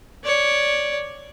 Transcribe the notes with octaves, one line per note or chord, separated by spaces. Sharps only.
C#5 D5